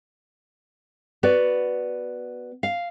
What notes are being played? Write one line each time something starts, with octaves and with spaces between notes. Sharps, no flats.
B3 F#4 D5
F5